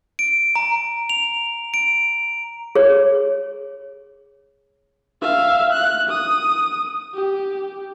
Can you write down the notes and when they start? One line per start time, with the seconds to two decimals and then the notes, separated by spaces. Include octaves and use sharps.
0.19 D7
0.56 A#5
1.10 F7
1.74 D7
2.75 G#4 C#5
5.22 E5 F5
5.73 F#6
6.09 D#6
7.14 G4